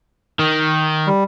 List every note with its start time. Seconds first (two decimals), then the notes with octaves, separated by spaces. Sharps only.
0.39 D#3
1.07 G3